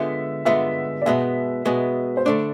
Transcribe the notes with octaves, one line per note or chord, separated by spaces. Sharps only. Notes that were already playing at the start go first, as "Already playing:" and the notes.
Already playing: D3 G#3 B3 F4 E5
D3 G#3 B3 F4 E5
D5
B2 G#3 B3 E5
B2 G#3 B3
C5
D3 A3 D4 D5